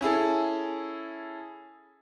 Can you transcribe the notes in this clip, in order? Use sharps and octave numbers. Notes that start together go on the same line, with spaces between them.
C#4 E4 G#4 A4